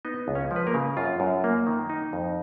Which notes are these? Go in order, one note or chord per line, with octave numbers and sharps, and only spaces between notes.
B3 D#4 D#5
C#2
C#4 C#5
F3
B4
A#3 A#4
C#3
F#2 F4
F#2
A#3
D#3
D#4
F2